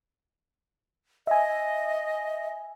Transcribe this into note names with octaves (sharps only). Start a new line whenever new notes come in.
D#5 E5 G#5